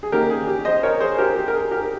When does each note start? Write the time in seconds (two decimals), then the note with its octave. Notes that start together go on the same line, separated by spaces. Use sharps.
0.03 G#4
0.12 D#3 A#3 C#4 G4 A#4
0.30 G#4
0.47 G4
0.65 C5 D#5
0.83 A#4 C#5
1.00 G#4 C5
1.18 G4 A#4
1.36 G4
1.48 A#4
1.53 G#4
1.71 G4 A#4